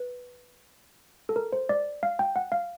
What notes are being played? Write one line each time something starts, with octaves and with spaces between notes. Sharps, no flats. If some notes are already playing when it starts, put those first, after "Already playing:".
Already playing: B4
A4
A#4
C5
D5
F5
G5
F#5
F5